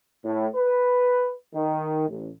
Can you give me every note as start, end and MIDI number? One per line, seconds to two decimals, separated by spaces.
0.24 0.47 45
0.56 1.33 71
1.54 2.05 51
2.07 2.29 33